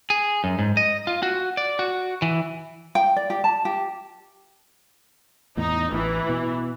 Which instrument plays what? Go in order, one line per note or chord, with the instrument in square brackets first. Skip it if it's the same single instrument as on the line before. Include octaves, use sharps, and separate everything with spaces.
[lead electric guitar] G#4
F#2
G#2
D#5
F4
F#4
D5
F#4
E3
[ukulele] G5
D5
G4
A5
G4
[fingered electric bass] E2 A2 [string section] D#4
[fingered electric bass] A1 [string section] E3
[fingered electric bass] B2